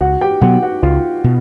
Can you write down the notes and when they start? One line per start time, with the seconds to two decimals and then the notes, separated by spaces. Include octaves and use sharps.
0.01 C#2 F#4 F#5
0.21 G4 G5
0.41 B2 F#3 B3 F#4 F#5
0.63 F#4 F#5
0.82 C#2 F4 F5
1.24 B2